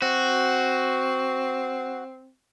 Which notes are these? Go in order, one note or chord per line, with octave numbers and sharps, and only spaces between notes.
C4 F#4